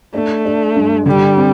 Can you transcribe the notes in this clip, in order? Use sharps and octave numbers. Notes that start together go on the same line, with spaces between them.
A3 D4
D4
G2
D3 G3
C4